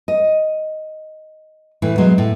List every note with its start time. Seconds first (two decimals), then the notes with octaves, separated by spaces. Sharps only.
0.08 D#5
1.82 A2 E3 A3
1.98 B2 F#3 G#3
2.18 A2